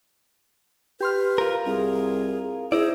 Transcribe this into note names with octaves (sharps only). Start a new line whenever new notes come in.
G4 B4 C6 F6
F4 A#4
C2 G#4
D#4 E4 G#4 C5 D5